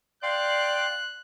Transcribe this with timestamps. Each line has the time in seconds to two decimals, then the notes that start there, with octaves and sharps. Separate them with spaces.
0.23 D5 F5 G5 C6 F#6